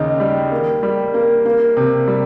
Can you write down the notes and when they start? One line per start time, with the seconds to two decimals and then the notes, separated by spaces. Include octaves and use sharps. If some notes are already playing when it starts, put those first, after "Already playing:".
Already playing: D#2 C#3 D#4
0.20 G3
0.52 A#3
0.83 G3
1.14 A#3
1.45 A#3
1.77 C3
2.08 G3